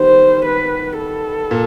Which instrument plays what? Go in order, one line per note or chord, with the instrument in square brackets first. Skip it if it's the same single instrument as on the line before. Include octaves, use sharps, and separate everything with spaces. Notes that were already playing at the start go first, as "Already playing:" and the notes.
Already playing: [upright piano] D#3 G3 B3 [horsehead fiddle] C5
[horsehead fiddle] B4
A4
[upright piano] A#2